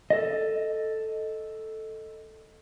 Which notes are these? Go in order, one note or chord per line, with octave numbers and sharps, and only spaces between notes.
A4 D#5